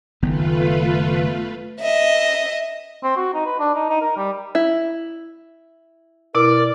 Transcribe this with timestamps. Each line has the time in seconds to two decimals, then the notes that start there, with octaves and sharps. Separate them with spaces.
0.22 F#1 D#3 A3 B3 F4 B4
1.81 D#5 E5
3.04 C4
3.17 F#4
3.34 D#4
3.46 B4
3.60 D4
3.75 D#4
3.89 D#4
4.01 A#4
4.17 G3
4.55 E4
6.35 B2 E4 A#4 D5